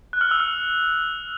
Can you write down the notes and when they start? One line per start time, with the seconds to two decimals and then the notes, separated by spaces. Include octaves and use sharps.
0.13 F#6
0.21 F6
0.31 E6
0.40 F6